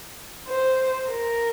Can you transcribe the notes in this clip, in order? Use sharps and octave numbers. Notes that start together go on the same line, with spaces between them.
C5
A#4